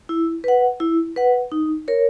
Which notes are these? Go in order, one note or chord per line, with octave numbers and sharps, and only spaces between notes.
E4
B4 F#5
E4
B4 F#5
D#4
A#4 C#5